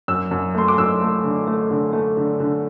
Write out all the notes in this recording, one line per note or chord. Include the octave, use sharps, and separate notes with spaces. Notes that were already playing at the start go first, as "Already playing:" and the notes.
F#2 E6
F#2
A3 C6
D6
F#2 E6
A3
D3
A3
D3
A3
D3
D3